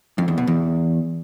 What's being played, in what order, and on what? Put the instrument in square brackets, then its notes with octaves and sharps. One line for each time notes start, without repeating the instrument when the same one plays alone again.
[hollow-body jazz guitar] F2
E2
B2
E2